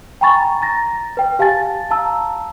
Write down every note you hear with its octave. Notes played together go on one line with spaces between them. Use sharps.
G5 G#5 A#5 B5 C#6 A6
A#5 A6 A#6
B4 G5
G4 F5 G#5 A5 A6
F5 A5 A#5 E6